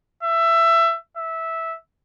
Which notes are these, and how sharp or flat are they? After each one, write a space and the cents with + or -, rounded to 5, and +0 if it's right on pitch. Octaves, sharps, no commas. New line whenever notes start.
E5 +20
E5 -10